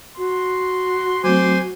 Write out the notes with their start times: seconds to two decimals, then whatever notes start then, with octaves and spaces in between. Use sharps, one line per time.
0.18 F#4 C6
1.24 F#3 A3 C4 C5 G#5 C6 D6